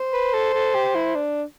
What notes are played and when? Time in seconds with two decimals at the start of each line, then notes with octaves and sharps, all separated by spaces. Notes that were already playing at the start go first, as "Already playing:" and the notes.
Already playing: C5
0.13 B4
0.34 A4
0.54 A4
0.75 G4
0.95 E4
1.15 D4